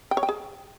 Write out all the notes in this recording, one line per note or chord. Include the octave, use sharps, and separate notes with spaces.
G5
C#5
G5
G#4